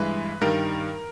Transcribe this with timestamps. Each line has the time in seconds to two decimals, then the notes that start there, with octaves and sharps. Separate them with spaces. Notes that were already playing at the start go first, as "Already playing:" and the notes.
Already playing: G2 E3 G#3 B4
0.41 G2 D#3 G3 A#4